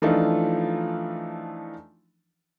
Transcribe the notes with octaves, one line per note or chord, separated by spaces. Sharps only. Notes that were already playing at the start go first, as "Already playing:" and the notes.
E3 F3 A3 D4 D#4 F4